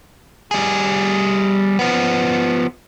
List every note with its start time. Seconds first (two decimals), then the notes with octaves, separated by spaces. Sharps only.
0.51 G3 G#4
1.79 F3 B3